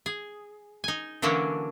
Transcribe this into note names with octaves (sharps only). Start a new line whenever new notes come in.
G#4
D#4 G#5
D3 E3 F#3 A#3 C#4 D4